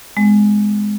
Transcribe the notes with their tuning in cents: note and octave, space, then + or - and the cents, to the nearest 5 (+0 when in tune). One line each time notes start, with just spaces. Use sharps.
G#3 +0 B3 +45